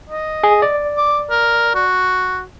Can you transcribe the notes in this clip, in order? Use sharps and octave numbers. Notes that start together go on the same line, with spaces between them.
D#5
G#4
D5
D6
A#4
F#4